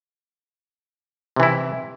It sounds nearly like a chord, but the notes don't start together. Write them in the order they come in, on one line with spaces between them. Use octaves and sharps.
C3 E3 E4